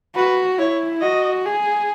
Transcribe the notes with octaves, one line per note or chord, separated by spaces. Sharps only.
F#4 B4
E4 C#5
F#4 D#5
G#4